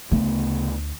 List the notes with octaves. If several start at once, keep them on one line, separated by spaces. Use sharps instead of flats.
D2 C#3 A3 B3